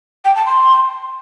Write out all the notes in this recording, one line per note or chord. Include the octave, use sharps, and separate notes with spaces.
G5
A5
C6